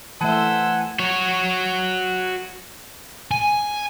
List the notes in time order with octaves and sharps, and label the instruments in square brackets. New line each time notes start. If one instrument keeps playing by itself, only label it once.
[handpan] E3 A3 E5 [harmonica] C5 E6 [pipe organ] F#5 G#5 [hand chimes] A5
[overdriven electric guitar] F#4 C#5
[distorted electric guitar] G#5